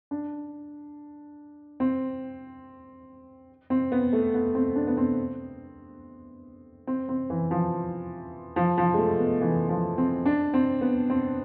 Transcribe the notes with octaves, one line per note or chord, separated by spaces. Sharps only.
D4
C4
C4
B3
A3
B3
C4
D4
B3
C4
C4
C4
E3
F3
F3
F3
G#3
A3
B3
E3
F3
C4
D4
C4
B3
C4